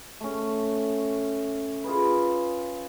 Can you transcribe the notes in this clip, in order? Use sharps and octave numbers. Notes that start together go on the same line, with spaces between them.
A3 C#4
F4 G#4 B4